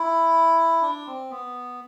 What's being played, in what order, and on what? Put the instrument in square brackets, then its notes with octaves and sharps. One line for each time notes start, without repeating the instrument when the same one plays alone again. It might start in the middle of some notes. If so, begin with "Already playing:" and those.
Already playing: [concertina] E4
D4
C4
B3